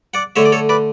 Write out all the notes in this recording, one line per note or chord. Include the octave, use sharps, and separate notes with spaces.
D5 F#5
D3 A3 C#5 E5
D5
A4 C#5
B4 D5